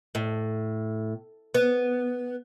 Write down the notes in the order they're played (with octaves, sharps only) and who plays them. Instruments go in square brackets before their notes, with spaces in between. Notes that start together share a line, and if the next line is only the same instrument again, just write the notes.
[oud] A2
B3